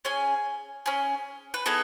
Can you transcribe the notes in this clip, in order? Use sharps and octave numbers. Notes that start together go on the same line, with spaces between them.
C#4 G#4 G#5
C#4 G#4
B4
B3 D#4 G#4 A4